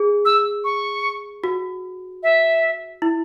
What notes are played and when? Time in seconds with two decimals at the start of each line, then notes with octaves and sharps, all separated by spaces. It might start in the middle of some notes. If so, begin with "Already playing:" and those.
Already playing: G#4
0.25 E6
0.64 C#6
1.44 F#4
2.23 E5
3.02 E4